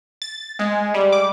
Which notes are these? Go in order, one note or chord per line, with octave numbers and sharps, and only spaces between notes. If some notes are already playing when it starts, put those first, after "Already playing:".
A6
G#3
G3
D6